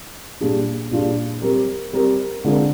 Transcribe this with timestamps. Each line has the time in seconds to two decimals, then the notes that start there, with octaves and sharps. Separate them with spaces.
0.41 A#2 G3 D4 F4 G#4
0.91 A#2 G3 D4 F4 G#4
1.42 G3 C4 G4 A#4
1.93 G3 C4 G4 A#4
2.44 D3 G#3 C4 F4 A#4